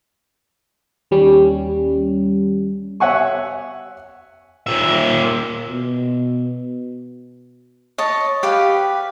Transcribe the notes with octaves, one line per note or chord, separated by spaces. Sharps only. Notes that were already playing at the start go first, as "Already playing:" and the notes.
D#2 G3 C#4
C#5 E5 F#5 G#5 C#6
A#2 E5
B2
C#5 D#5 A5
G4 B4 F5